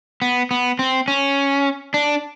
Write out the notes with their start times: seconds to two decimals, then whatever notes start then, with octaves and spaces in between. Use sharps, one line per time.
0.22 B3
0.51 B3
0.79 C4
1.08 C#4
1.94 D4